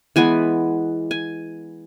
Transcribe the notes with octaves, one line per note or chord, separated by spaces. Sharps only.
E3 G#3 B3 G#5
G#5